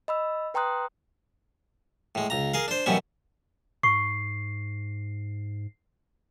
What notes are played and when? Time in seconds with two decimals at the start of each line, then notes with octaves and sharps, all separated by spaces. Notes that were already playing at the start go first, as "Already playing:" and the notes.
0.08 D#5 B5 E6
0.54 B4 G5 A#5 C6 D#6 F#6
2.15 A2 G#3
2.30 C#2 A#5
2.54 G#4 A#4 F5
2.68 D4 C5
2.86 A1 F#2 B2 G3 C#4 E5
3.83 G#2 C#6 C7